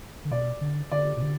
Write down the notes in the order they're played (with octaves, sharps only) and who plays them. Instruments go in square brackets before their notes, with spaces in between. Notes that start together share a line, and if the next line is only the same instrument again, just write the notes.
[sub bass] D3
[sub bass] B2 [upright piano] D5
[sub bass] D3
[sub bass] D3 [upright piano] D5
[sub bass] B2
D3